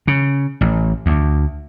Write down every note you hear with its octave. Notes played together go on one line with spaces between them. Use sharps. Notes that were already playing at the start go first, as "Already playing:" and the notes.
C#3
A1
D2